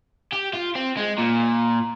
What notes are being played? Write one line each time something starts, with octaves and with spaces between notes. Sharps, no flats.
G4
F4
C4
G#3
A#2